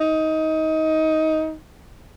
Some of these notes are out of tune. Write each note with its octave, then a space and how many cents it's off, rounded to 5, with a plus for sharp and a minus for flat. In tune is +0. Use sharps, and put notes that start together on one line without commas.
D#4 +20